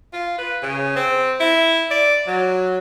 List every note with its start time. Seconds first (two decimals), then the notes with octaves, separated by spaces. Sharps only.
0.13 F4
0.38 B4
0.63 C#3
0.96 C4
1.40 E4
1.91 D5
2.27 F#3